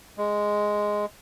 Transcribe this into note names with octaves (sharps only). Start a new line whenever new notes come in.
G#3